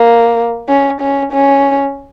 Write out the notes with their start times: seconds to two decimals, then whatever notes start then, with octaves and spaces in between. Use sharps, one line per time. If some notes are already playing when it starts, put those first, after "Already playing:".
Already playing: A#3
0.68 C#4
1.01 C#4
1.32 C#4